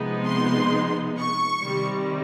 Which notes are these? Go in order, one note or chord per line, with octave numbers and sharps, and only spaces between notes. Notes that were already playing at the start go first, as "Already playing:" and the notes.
Already playing: C3 F3 G#3 B3 D#4
C6
C#6
C3 D#3 G3